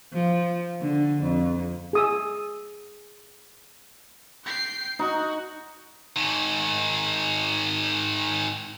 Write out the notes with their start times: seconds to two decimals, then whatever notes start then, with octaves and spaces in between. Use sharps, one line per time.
0.13 F3
0.81 D3
1.22 F2
1.93 G#4 D#6 E6
4.44 G5 C7
4.99 D#4 F#4
6.16 G#2 D#3